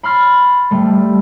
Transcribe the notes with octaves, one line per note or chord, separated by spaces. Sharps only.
B5 C6 F6 A6
G3 A3